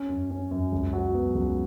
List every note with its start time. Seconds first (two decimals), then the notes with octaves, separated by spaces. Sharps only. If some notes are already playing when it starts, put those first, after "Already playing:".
Already playing: C#4
0.09 F#2
0.31 C#4
0.51 F#2
0.72 C#2
0.93 F#3
1.14 B3
1.34 C#2